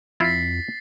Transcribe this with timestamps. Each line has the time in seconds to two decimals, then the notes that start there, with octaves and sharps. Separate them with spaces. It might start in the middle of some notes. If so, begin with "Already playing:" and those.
0.20 F2 E4 F4 A6 B6 C7